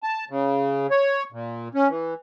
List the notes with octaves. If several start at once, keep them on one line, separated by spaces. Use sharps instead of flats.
A5
C#3
C#5
A#2
C#4
E3